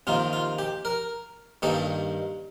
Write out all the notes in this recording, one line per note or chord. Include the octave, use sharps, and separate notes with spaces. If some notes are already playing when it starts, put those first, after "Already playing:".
C3 D#3 A#3 F4
F4
G4
A#4
G2 D#3 G3 A#3 A4